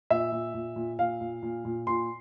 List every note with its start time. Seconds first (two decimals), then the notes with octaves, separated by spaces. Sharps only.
0.10 A#2 E5
0.32 A#2
0.54 A#2
0.76 A#2
0.99 A#2 F5
1.21 A#2
1.43 A#2
1.65 A#2
1.87 A#2 C6